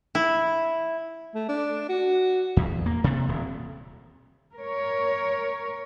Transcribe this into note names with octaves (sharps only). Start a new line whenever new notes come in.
E4
A3
D4
F#4
E2
A#3
C3
D#1
A#4 C#5